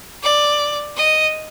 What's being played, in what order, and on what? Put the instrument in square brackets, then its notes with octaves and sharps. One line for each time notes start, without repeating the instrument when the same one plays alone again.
[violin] D5
D#5